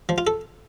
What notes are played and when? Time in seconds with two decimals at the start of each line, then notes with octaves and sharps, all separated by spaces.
0.09 F3
0.18 F4
0.27 A4